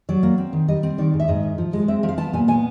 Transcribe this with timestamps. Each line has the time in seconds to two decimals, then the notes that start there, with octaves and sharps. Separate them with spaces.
0.09 F#3 D5
0.23 A#3
0.38 C4
0.53 D#3
0.68 G3 D#5
0.83 C4
0.98 D#3 D5
1.14 G#2
1.20 E5
1.28 G#2 D#5
1.43 D#3
1.58 F3
1.73 G#3
1.88 C4 E5
2.03 F3
2.09 F5
2.18 B3 A5
2.33 A#2 G#5
2.48 B3 G#5